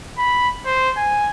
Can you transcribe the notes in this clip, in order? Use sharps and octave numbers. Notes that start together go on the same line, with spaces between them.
B5
C5
G#5